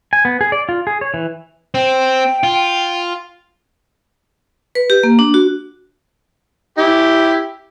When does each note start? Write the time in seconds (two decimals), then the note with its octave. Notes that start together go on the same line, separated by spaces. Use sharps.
0.13 G#5
0.25 B3
0.41 G#4
0.52 D5
0.69 F4
0.87 G#4
1.01 C#5
1.14 E3
1.74 C4 G5
2.43 F4
4.75 B4
4.90 G4
5.03 A#3
5.19 D4
5.34 F#4
6.78 E4 G4